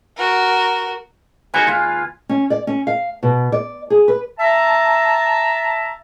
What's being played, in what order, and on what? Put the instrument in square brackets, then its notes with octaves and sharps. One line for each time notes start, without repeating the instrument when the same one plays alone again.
[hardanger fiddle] F#4 A#4
[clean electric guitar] D#4 F#4 A#4 [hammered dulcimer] G#4 B4 [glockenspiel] G#5 F#6 G#6
[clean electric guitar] D#2 [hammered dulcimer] F4 F5
[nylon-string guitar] C#4
D5
C#4
F5
B2
D5
G#4
B4
[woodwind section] E5 A5 A#5